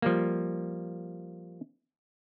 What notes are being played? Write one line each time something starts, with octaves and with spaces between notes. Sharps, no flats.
F3 G3 A#3